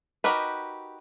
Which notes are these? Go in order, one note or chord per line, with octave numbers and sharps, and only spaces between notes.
D#4 F#4 G4 A#4 B4